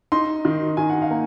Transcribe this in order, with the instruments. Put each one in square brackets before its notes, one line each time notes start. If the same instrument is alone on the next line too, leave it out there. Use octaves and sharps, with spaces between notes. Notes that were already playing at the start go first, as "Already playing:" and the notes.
[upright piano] D#4 C6
D#3
D#3 G#5
F#5
F5
A#3